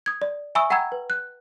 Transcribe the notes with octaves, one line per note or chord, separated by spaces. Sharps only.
D#6 G#6
D5
E5 G#5 B5 C#6 D#6 E6
F#5 G5 A#5 B5 E6 G#6
B4
F#6